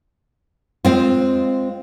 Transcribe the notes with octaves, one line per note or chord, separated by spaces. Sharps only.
G#3 C4 F4